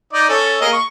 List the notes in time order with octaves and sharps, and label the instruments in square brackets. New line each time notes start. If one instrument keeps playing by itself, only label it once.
[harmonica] D#4 D5 D#5
C#4 A4
A#3 G#4 D#5
C#6